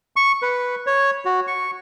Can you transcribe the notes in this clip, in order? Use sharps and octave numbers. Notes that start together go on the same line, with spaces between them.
C#6
B4
C#5
F#4
C#6